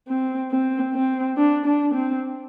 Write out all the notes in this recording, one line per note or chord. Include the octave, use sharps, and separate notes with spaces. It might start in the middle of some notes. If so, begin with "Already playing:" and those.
C4
C4
C4
D4
D4
C4